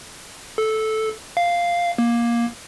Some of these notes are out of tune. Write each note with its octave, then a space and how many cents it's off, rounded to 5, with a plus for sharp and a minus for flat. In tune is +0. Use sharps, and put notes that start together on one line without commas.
A4 -10
F5 -5
A#3 +15